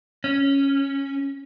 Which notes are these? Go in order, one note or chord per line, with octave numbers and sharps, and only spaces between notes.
C#4